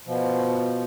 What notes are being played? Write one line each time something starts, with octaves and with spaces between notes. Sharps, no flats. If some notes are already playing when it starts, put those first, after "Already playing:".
B2 F3